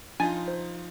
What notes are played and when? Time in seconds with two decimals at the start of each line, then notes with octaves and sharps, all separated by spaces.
0.20 F3 D4 D#4 F4 G#5 A6
0.48 C5